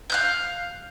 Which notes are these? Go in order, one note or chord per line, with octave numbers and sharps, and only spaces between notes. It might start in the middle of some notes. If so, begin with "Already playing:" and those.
F5 F#6 G6